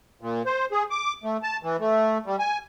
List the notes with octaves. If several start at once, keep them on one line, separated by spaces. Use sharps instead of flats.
A#2
C5
G#4
D6
A3
A5
E3
A3
G3
G#5